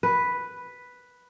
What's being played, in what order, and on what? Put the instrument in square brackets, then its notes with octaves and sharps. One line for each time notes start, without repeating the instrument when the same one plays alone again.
[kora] B4